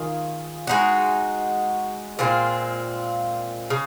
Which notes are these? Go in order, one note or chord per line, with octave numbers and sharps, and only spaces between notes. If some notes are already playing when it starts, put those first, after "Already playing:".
Already playing: D#3 F4 G#4
G#3 D#4 F#4
A#2 G#3 C4 F4
C#3